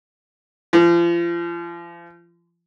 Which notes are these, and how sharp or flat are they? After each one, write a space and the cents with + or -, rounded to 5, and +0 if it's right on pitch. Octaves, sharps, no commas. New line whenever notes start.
F3 -35